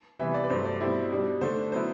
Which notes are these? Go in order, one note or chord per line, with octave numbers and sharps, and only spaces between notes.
C3 E3 G3 B3 E5
D5
B4
G2 F#3 A3 C5
D5
B2 G3 C4 E4
B2 G3 D4
D3 A3 D4 C5
F#3 B3 E4 C5